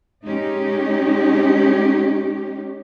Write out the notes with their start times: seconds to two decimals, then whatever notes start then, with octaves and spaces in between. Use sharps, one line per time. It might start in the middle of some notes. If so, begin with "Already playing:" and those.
0.23 G#3 C#4 D#4 G4